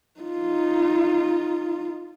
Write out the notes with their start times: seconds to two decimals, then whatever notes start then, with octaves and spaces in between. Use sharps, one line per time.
0.20 D#4 F4